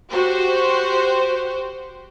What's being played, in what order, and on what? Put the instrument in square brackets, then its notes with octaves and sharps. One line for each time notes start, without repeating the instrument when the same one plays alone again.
[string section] F#4 G4 C5